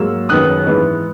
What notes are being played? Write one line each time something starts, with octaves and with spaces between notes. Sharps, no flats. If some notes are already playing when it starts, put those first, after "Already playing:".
Already playing: G#2 F#3 A#3 E6
F#1 F#2 D#3 F#3 B3 D#6 F#6
G#2 E3 B3 D#4